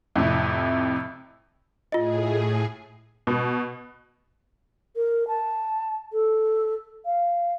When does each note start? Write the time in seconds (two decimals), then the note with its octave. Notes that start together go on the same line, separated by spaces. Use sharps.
0.16 F2 A2 C3
1.92 A2 F4 G#4 D#5
3.27 B2
4.96 A#4
5.28 A5
6.13 A4
7.05 F5